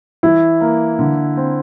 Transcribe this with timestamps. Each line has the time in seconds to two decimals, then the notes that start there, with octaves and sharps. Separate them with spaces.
0.23 E3 E4
0.61 A#3
0.99 D3
1.36 C4